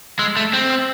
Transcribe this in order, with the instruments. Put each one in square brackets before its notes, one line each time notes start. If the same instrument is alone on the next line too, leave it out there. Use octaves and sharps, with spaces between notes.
[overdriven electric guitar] G#3 [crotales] E6
[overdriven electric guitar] A3
C4
[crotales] E6